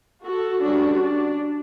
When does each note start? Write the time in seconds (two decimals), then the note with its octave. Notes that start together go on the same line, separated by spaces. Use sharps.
0.23 F#4 A4
0.62 D3 G3 C#4 D4 F#4
1.00 D4